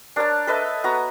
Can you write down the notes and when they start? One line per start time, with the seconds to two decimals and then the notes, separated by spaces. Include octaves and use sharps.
0.16 D4 A#4 C#5 A5
0.47 A4 B4 D#5 E5
0.84 B3 F#4 A#5